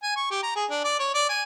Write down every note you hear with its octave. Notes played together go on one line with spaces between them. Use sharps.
G#5
C#6
G4
A#5
G#4
D4
D5
C#5
D5
G#5